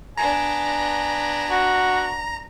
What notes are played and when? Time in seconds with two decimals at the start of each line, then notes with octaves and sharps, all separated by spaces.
0.17 B3 D4 G#5 A#5
1.50 F#4